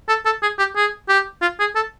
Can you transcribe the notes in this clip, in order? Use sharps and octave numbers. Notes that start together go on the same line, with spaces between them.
A4
A4
G#4
G4
G#4
G4
F4
G#4
A4